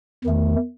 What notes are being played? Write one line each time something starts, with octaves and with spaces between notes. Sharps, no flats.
E2 D#3 A3